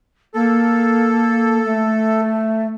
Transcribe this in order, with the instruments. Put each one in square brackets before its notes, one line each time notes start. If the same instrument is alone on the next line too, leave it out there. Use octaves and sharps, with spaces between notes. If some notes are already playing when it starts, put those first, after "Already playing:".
[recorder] A#3 [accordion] A4
[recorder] A3